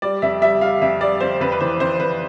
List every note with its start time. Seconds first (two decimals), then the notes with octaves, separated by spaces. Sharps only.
0.02 G3 D5
0.22 F2 E5
0.42 G3 E5
0.61 G3 F5
0.82 F2 E5
1.01 G3 D5
1.21 F2 C5
1.40 F2 B4
1.52 B4
1.60 E3 C5
1.80 F2 C5
2.00 F2 B4